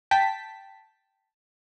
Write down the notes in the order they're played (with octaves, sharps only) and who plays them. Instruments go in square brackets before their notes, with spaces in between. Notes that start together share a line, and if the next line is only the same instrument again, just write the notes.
[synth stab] G5 A5 B6